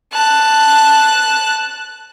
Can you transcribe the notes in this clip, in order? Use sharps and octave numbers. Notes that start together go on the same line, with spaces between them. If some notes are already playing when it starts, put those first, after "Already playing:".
A5 F#6